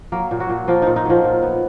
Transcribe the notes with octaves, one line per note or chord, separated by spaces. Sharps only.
F#3 A#3 A#4
A#2
F#3 F#4
A#2
F3 A#3 F4
A#2 D#4
D#4
F3 F#3 F4
A#2
B3